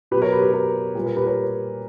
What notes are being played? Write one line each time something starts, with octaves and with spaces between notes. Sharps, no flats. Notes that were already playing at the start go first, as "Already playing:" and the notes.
B2 F#3 G4 B4
A#4 C#5
G4 B4
G4
A#4
A#2 G3 B4
A#4
G4 B4
A#4 C#5